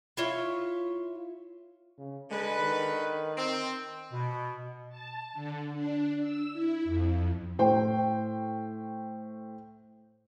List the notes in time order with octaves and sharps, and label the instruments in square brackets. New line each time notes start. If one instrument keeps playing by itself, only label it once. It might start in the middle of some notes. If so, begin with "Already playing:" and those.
[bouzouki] E4 F4 C#5 E5
[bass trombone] C#3
[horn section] D3 B4 [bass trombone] G#3
[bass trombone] D#3
[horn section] C4
[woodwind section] B2
[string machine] A5
D3
D4
E6
E4
F2
[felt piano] A2 C5 G5